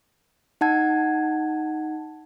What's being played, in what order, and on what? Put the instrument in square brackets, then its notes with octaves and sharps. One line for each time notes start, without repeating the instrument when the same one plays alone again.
[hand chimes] D#4 F#5 A5 G#6